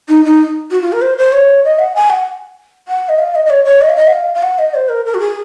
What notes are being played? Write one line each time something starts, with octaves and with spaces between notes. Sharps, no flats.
D#4
D#4
F#4
F4
A#4
C5
C5
C#5
D#5
F#5
G#5
F#5
F#5
D#5
F5
D#5
D#5
C#5
C#5
D#5
F5
D#5
F#5
F5
F5
F#5
D#5
C5
A#4
A#4
F#4
G#4